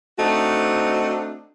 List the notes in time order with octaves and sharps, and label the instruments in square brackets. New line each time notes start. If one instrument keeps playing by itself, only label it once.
[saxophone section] A3 C4 D4 D#4 F#4